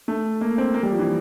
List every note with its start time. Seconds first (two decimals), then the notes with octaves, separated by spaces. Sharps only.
0.08 A3
0.41 A#3
0.58 C4
0.74 A#3
0.83 G3
0.91 F3
0.99 E3